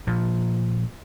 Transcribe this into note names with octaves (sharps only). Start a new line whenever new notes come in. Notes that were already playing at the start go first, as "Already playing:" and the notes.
A#2 F3